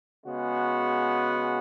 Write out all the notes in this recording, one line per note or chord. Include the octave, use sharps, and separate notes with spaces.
C#3 G#3 B3 F#4